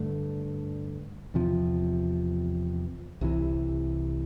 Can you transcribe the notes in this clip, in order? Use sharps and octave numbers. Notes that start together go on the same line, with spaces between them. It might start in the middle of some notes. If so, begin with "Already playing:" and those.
Already playing: G2 D3 A3
E2 C3 F3
C2 C3 E3